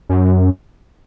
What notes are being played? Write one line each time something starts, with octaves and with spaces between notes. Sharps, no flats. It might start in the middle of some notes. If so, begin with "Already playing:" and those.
F#2